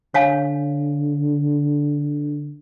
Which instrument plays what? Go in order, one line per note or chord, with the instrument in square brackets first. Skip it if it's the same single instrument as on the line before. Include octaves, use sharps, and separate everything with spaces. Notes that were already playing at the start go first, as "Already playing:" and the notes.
[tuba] D3 [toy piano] C#5 F5 G#5